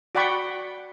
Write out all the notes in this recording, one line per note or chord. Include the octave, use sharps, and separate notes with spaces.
F#4 D5 F#5 G5 B5 C#6